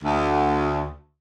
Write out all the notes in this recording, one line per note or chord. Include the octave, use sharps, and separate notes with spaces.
D2